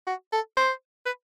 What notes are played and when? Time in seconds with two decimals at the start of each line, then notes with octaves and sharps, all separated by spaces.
0.07 F#4
0.32 A4
0.57 C5
1.06 B4